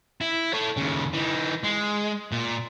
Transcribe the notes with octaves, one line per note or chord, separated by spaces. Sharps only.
E4
A4 C#5
D#2 C#3
E3 D#4
G#3
A#2